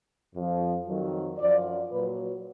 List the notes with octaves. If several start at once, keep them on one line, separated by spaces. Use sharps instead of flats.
F2 F3
F2 D#3 F#3
F#2 F3 D5
A#2 B4
F#3